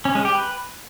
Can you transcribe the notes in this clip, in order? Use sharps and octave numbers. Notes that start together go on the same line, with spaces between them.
C#4
G#3
G4
B4